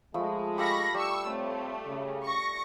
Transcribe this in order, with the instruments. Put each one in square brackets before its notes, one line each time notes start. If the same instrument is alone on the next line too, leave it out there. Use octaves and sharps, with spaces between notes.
[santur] F3 A3 B5 [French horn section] G#3
[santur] G4 A4 F5 [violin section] B5 C#6 A#6
[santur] G3 [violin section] C#6 E6
[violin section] A3 [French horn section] C4 C#5
[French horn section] C#3
[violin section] C#6 A#6